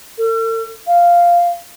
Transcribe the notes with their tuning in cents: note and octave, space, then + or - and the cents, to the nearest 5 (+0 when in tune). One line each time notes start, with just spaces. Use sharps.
A4 +45
F5 -5